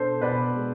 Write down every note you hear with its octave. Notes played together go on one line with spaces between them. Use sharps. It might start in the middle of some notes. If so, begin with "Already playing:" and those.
Already playing: B2 D4 A4 C5
B2 B4 D5
G#3